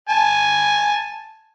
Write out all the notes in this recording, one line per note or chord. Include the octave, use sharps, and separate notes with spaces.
G#5 A5